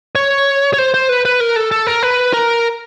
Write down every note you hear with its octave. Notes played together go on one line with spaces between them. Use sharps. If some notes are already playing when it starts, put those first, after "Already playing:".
C#5
C#5
C5
C5
B4
B4
A#4
A4
A4
A#4
B4
A#4